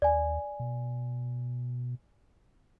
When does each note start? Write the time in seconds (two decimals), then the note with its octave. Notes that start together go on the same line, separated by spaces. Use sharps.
0.02 D#2 D5 G#5
0.60 B2